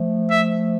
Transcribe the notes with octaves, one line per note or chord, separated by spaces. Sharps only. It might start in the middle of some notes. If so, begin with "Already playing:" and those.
Already playing: F3 A3
E5